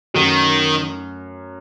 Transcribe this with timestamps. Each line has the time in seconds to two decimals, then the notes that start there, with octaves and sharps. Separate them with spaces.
0.14 F#2 D#3 F#3 A3